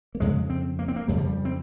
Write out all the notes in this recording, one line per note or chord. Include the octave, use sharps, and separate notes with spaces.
A#3
F2 C#3 G#3
C4
A#3
C4
A#3
F2 C#3 G3
F3
G3
C4